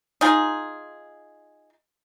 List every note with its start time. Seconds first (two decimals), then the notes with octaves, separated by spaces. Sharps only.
0.21 D#4 F4 G#4